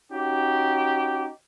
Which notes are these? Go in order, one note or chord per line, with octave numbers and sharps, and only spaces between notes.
C#4 D#4 F#4 G4